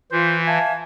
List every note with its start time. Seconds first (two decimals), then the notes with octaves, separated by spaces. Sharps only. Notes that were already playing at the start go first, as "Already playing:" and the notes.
0.12 E3 F4 C5
0.47 E5 F5 G#5 A5